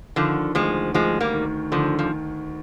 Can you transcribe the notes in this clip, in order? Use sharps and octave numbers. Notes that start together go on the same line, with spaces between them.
D3 D#3 F3
D2 F3 G#3
D2 F3 G#3
G3 A#3
D#3
D3 D#3 F3
F3